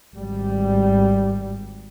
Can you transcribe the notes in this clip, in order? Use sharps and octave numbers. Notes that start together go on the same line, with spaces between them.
G#1 G3